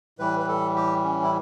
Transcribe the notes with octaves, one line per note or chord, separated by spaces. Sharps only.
A2 E3 G3 B4
B4
A4
G4
C#4
E4